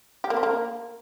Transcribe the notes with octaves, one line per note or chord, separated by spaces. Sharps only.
G4
A#3
C4
A#3